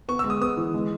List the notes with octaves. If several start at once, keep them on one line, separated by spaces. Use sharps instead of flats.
B3 C#6
E6
G#3
D#6
B3 D#6
E3
G#3